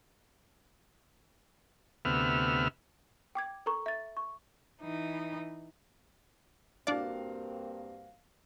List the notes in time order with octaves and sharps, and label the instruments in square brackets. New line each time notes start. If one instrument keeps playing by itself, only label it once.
[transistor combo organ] D2 C3 B3 E5 F6
[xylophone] G5 D6 G#6
A4 A#4 A#5 C#6
E5 A6
C#6
[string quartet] E3 D#4
[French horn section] G2 A#3 C4 [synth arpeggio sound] D4 D5 [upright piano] F#4 F5